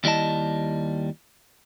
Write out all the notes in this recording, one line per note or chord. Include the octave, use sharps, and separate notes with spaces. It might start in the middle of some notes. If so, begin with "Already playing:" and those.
D#2 G3 E4 D#5 A5